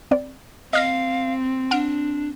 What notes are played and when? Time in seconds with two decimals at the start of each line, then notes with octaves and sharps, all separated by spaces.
0.11 C4 D5
0.73 C4 D#5 F5 F6 A#6
1.71 D4 F#5 F6 D7